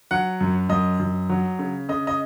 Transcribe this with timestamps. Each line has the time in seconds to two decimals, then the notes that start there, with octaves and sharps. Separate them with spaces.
0.11 F#3 F#5
0.41 F#2
0.69 F#2 D#5
0.99 F#2
1.29 F#3
1.59 C#3
1.89 C#3 D#5
2.07 D#5